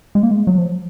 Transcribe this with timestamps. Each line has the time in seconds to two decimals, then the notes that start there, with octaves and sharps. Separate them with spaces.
0.15 G#3
0.23 A#3
0.31 G#3
0.47 F#3
0.58 F3